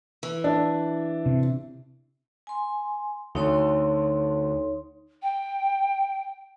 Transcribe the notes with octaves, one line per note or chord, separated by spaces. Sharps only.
E3
D4
C3
G#5 C6
D2 D#4 C#5 C6
G5